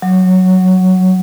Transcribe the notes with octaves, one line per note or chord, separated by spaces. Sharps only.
F#3